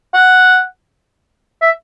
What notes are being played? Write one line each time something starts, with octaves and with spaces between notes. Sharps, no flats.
F#5
E5